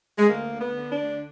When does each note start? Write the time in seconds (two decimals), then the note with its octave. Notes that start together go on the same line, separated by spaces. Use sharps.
0.19 G#3
0.28 D2 A#3
0.51 D3
0.60 B3
0.75 D3
0.90 D4
0.99 D2